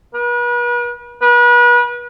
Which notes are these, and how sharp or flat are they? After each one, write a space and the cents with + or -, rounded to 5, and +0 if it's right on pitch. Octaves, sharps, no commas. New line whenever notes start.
B4 -40
B4 -35